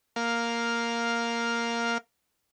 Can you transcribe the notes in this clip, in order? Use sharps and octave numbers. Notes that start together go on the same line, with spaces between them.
A#3 F5